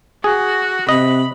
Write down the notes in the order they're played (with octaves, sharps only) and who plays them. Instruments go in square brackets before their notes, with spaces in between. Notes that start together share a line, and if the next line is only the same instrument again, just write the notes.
[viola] F#4 [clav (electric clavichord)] G#4
[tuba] C3 [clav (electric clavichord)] D#5 [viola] B5